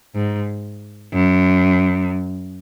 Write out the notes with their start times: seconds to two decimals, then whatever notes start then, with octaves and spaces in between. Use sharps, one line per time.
0.15 G#2
1.14 F#2